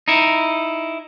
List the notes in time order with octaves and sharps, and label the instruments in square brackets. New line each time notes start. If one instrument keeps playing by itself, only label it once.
[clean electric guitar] D#4 E4